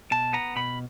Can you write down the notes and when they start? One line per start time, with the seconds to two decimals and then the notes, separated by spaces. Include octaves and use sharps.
0.11 B2 A5
0.33 B3 A#5
0.56 B2 B5